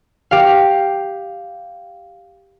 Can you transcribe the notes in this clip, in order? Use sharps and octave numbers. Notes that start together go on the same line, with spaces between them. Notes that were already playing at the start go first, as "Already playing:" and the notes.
G4 F5